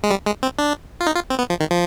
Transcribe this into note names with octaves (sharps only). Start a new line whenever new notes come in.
G#3
G3
G#3
C4
D4
F4
D#4
F4
C4
B3
F3
D#3
F3